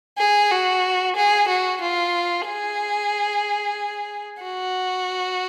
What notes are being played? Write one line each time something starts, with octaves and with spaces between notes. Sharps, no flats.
G#4
F#4
G#4
F#4
F4
G#4
F#4